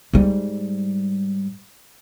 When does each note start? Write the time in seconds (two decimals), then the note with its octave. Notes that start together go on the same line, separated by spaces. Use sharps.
0.13 G#2 G3